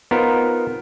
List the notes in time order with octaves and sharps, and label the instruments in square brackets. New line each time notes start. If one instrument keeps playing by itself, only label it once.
[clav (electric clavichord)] B3 D#4 F4 A#4 C5